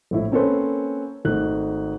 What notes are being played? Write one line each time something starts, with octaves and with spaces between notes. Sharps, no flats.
A#1 A2 E4
A#3 C4 C#4 A4 B4 C5
G#1 D#3 A3 D#4 F#6